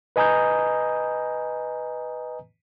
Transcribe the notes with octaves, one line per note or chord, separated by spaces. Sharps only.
B4 D#5 G#5 A#5 D#6 G6